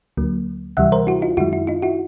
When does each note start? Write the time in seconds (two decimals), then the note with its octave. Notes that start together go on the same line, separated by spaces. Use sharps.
0.17 D2 D3 F#3 A#3
0.77 D2 C3 E3 G3 E5 F#5
0.92 A#4 C5
1.07 E4 F#4
1.22 D#4 F4
1.37 F#2 D#3 G#3 E4 F#4
1.53 E4
1.67 D#4 F4
1.82 E4 F#4